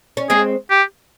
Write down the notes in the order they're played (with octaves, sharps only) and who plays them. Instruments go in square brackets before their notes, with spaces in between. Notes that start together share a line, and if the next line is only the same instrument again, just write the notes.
[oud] C#4
[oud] G#3 C4 [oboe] G#4
[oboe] G4